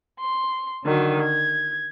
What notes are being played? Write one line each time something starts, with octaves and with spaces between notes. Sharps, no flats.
C6
D3 D#3 F#3
G#6